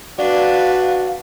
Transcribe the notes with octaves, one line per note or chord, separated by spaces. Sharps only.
D4 F#4 B4 D5 F5